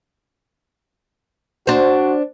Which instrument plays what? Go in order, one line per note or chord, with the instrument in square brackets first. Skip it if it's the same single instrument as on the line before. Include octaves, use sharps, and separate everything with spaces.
[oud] D4 C5 [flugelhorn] F#4